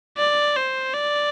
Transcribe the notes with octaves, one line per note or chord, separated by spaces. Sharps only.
D5
C5
D5